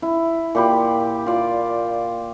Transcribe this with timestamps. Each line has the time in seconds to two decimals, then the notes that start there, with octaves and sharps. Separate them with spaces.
0.02 E4
0.55 A#2 G4 B5
1.26 F4 D5